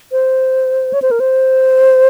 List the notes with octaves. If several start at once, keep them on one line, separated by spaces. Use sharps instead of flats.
C5
C#5
C5
A#4
C5